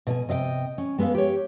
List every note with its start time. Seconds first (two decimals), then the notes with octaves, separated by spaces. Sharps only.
0.07 B2 D#5 G#5
0.29 C3 D#5 F5 G5
0.78 C#4
0.98 G#3 B3 A4 B4 F5
1.15 G4 C#5